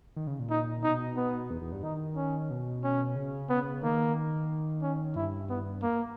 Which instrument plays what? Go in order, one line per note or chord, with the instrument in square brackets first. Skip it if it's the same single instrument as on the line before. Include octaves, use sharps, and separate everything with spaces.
[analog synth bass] D#3
C#3
A#2
[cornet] D#4
[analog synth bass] B2 [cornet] D#4
[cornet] B3
[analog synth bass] E2
E2
G2
[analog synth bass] D#3 [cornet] D#4
[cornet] C#4
[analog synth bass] B2
[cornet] C#4
[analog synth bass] C#3
[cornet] B3
[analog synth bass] D#3 [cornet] A#3
[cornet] C#4
[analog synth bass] G2 [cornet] E4
[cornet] B3
A#3